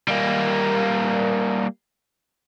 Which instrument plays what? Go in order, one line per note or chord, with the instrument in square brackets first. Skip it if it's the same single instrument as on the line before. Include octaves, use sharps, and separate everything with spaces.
[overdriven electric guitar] G3 A#3